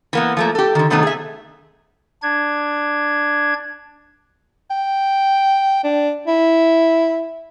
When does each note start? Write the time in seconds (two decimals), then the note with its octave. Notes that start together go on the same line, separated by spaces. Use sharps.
0.13 E3 A#3 B3
0.37 F3 A3 A#3
0.55 G4 A4
0.75 D3 D#3
0.90 C3 D#3 F#3 A3 B3 D#4
1.03 G#4 E5
2.22 D4 G#6
4.71 G5
5.84 D4
6.27 E4